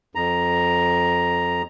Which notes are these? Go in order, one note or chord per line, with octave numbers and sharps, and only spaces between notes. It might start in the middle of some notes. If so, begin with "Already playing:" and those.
F2 A#5